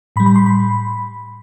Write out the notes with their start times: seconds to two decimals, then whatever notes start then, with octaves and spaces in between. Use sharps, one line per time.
0.16 A2 B5
0.20 G3
0.26 B5
0.36 C6
0.46 B5